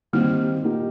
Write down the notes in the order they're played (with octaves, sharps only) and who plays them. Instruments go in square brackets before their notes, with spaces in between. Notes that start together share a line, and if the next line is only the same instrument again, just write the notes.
[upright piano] D#3 G3 C4 D#4 G4 [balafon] A#3
[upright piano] A#2 A#3 D#4 G4